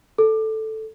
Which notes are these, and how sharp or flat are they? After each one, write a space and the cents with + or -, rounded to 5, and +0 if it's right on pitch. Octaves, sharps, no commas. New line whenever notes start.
A4 +0